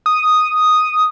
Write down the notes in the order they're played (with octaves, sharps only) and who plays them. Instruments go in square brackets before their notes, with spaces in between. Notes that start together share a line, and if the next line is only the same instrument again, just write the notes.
[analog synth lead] D#6